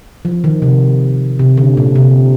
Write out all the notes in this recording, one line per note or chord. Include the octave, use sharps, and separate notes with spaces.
F3
D#3
C3
C3
D3
A#2
C3